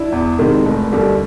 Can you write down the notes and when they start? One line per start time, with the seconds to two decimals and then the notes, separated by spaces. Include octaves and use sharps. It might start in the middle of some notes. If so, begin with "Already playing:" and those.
Already playing: D4 E4
0.12 E2
0.39 C3 D#3 G#3
0.66 F1
0.92 D#2 D3 G3